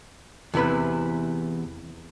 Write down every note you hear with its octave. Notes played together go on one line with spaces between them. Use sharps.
E2 C3 E4 B4 B5